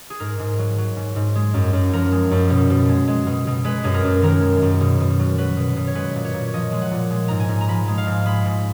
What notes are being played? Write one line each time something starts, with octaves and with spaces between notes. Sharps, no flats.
G#4
G#2 A#4
G#2
F#3
F#3
G#2
G#2
G#3
F#2
F#2
F3 A#4
G#3
F#2
B2
B2
G#3
G#3
B2
B2
G#3 B4
F#2 G#4
A#4
F#2
D#3 A#4
G#3
F#2
B2
B2
F#3
F#3 B4
B2
B2
C#5
G#3 B4
A#2
C#5
A#2
C#5
F3 D#5
G#3
F#5
A#2
G#3
G#2 A#5
G#5
G#2
A#5
F3 B5
G#3
F5
G#2
G#3 B5
G#2